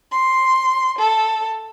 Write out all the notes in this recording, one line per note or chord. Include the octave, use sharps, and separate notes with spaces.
C6
A4